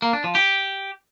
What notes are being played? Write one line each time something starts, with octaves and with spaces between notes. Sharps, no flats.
A#3
D4
F3
G4